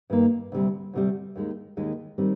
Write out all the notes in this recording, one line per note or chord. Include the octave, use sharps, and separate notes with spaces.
G2 D#3 A#3
D2 C3 G3
D2 C3 G3
D#2 D#3 G#3
D#2 D#3 G#3
D#3 G3 C4